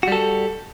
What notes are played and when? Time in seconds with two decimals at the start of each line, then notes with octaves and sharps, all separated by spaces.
0.03 F#4
0.08 G3
0.12 A4